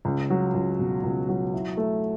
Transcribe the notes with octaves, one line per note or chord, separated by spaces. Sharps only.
C#2
F#3
C#2
B2
C#2
F#3
E4
A3